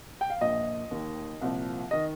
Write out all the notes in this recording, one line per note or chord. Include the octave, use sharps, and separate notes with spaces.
G5
F5
A#1 A#2 F3 D#5
D#2 D#3
C2 A#2 F3
D#3 D#5